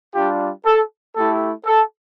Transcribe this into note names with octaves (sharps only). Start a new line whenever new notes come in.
G3 D4 F4 G4
A4
A3 E4 G4 A4
A4